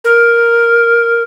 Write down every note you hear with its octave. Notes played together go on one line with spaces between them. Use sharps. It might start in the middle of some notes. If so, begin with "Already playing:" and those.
A#4